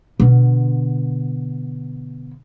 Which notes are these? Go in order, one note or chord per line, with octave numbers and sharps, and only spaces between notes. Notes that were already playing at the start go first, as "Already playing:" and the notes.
B2 D3